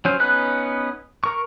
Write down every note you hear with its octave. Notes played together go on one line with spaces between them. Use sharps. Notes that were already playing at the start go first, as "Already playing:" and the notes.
F#3 C#4 C5
B3 C#4 D#4 B4 F#6
A#4 C#6